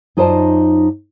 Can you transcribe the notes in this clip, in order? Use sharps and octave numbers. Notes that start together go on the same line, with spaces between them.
F#2 D#4 F4 C5 D5 A5